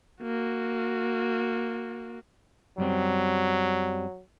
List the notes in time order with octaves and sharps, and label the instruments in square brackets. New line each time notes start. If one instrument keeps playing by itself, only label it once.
[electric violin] A#3 F#4
[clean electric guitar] F#2 G3 C4 [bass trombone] F#3